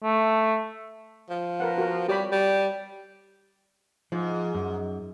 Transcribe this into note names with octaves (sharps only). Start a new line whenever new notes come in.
A3
F3
A#4 B4 F#5
F#4 A#4
G3 G4 C#5 B5
G3
G#2 F3
F#2